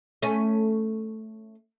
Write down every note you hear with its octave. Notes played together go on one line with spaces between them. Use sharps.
A3 C#4